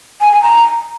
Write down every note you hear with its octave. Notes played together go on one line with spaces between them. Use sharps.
G#5
G#5
A#5